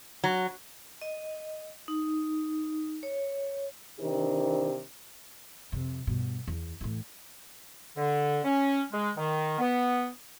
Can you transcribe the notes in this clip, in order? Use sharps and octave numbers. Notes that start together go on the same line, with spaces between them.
F#3
D#5
D#4
C#5
C3 D#3 E3 D4 G4 C5
F2 C3
G2 B2
E2
A2 E3
D3
C#4
G#3
D#3
B3